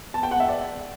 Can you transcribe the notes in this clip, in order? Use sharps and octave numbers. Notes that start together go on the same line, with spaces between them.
A5
G5
F#5
E5
D5